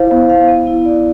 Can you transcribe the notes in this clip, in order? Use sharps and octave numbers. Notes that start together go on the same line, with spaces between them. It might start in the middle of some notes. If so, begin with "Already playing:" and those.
Already playing: E4 C5 F5
B3
F5
B3
E4
D5